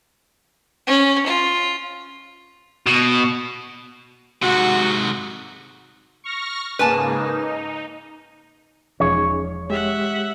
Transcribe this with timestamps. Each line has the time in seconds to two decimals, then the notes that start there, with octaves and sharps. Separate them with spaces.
0.87 C#4
1.26 F4
2.87 B2
4.42 G#2 C3 F#4
6.24 C#6 F6 A#6
6.79 G#2 C#3 A#3 B4 G#5 A5
7.18 D#4
9.00 E1 F3 C#4 D#4 G#4 C#5
9.70 G#3 G4 E5 F#5